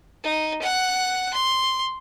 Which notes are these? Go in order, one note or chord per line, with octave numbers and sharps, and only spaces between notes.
D#4
F#5 F#6
C6